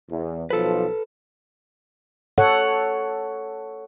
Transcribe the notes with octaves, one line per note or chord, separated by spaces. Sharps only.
E2
B1 F3 A4 B4
A4 C#5 F#5